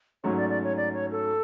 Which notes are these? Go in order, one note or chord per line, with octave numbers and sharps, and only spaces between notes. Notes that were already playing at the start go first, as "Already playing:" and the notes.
G#2 F#3 A3 C#4 F#4 C#5
D5
D5
C#5
D5
C#5
A4